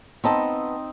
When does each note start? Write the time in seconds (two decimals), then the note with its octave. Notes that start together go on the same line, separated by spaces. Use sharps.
0.24 B3 C4 D#4 D#5 A5